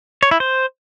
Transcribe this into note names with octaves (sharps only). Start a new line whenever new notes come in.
C#5
E4
C5